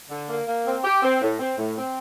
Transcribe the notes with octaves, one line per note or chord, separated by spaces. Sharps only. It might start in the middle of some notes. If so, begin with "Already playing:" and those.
D3
A#3
A#3
C4
G4
C4
A2
C4
A2
C4